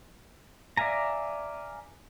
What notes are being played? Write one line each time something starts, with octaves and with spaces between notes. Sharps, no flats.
D5 E5 F5 G#5 A#5